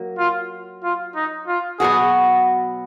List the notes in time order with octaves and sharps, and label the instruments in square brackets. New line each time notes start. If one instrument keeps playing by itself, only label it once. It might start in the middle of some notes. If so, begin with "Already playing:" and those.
Already playing: [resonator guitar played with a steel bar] F#3 A#3
[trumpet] F4
F4
D#4
F4
[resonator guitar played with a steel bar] B2 F#3 B3 F#4 [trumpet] G#4